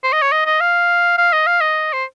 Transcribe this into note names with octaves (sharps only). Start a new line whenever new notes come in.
C5
D#5
C#5
D#5
D#5
F5
F5
D#5
F5
D#5
C5